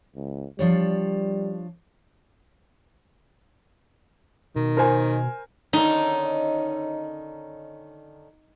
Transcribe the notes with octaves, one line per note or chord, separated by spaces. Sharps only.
C#2
F3 G3 D4 C#5
B2 D#3
A#4 C5 G#5
D3 D#3 C#4 D#4